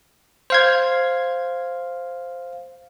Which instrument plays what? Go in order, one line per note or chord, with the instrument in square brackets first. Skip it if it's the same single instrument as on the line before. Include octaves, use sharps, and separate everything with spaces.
[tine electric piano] C5 F5 G#6